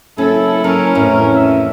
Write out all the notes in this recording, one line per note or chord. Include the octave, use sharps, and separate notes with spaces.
F#1 C#4 E4 A4
F#3 C#4 A#4
A1 F2 A2 A#4
E5